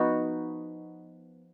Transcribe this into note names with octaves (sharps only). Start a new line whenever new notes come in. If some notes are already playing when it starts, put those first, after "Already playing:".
Already playing: F3 B3 D#4 F#4